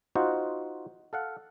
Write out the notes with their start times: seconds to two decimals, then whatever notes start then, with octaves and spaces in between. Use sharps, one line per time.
0.15 D#4 F4 F#4 C5 F#5
1.13 A4 F5 F#5